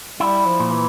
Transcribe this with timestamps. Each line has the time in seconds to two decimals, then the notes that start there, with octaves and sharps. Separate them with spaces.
0.20 G3 E4
0.46 F3
0.60 A#2
0.72 E3